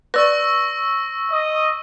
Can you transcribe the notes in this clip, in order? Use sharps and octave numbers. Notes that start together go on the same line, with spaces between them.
B4 D5 C#6 E6 A#6
D#5